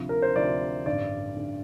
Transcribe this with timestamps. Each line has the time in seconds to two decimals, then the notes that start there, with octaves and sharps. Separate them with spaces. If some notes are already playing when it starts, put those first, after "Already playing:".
Already playing: D2 C3 F3
0.09 A#4
0.22 C5
0.36 D2 C3 F3 D5
0.86 A1 G2 D3 D5
1.36 G2 D3